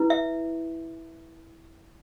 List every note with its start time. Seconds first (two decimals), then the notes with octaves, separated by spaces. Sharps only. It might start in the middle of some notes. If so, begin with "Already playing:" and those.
Already playing: E4 B4
0.10 E5